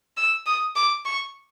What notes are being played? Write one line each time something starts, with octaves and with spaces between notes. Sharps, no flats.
E6
D#6
D6
C#6